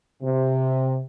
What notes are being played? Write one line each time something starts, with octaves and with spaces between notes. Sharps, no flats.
C3